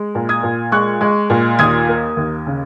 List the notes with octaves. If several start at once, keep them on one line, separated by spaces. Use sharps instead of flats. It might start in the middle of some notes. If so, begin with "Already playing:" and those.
Already playing: G#3
A#2
D#6 G#6
A#2
G#3 C#6 F#6
G#3
A#2
D#2 D#6 G#6
A#3
D#2
C#3